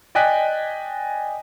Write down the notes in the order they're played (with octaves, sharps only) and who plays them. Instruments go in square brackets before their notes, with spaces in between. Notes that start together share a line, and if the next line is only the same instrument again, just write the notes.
[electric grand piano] D5 D#5 G5 G#5 F#6 B6